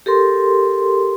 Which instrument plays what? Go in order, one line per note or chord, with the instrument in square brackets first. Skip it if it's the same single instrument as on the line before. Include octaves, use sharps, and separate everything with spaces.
[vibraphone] G4 A4 A#4 C6